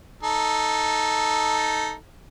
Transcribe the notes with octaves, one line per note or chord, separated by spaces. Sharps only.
D#4 A4